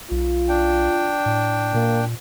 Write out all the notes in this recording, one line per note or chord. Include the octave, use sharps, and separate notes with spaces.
B1 F4
D4 G5
A2
A#2 A#3